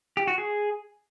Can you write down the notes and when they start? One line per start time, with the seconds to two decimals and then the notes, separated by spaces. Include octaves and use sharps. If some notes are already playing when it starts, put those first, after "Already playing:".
0.17 G4
0.27 F#4
0.38 G#4